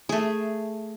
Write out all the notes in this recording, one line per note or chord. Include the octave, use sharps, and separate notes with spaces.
A3 G#4